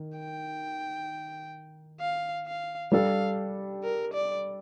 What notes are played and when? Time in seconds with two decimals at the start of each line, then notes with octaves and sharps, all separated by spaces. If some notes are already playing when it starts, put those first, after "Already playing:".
Already playing: D#3
0.18 G5
2.01 F5
2.47 F5
2.92 G3 D4 A4 F5
3.84 A#4
4.13 D5